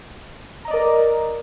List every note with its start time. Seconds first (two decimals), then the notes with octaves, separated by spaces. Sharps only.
0.65 A#5
0.68 D#5
0.71 D5
0.74 A#4